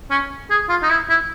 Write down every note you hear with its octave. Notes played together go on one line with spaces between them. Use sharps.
C#4
G#4
F4
D#4
E4
E4